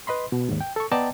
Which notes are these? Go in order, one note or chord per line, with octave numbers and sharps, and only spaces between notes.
B4 D#5 B5 C6
B2
D#2 G#2
G5
A4 C#6
B3 D5 D#5 G5 A5 A#5